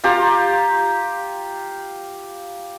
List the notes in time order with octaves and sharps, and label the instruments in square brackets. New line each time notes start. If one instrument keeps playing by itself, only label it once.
[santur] F4 G4 A#5